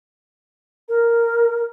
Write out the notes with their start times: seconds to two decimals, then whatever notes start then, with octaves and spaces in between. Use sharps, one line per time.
0.89 A#4